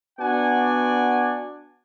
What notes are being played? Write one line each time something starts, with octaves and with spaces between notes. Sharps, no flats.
B3 D4 F#4 D5 F#5 G#5